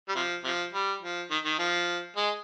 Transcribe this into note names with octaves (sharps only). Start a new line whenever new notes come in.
G3
C3 F3
C3 F3
G3
F3
D#3
D#3
F3
G#3